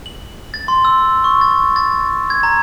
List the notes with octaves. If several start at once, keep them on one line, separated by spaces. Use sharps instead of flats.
F#7
A6
C6
E6
C#6
A6
A6
G#6
A#5